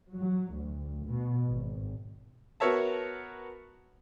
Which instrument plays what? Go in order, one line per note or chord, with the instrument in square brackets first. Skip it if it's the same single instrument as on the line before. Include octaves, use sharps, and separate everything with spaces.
[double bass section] F#3
D2
B2
G#1
[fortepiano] B3 F#4 A#4 C#5 E5 A5